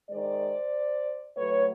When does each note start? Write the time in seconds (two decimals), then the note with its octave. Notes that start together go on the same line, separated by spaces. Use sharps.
0.10 D#3 G#3 C5 D5
1.36 A2 F#3 A3 B4 C#5